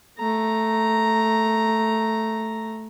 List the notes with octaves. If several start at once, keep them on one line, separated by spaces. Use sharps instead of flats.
A3 A#5